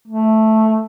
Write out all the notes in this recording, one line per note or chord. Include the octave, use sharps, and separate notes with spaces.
A3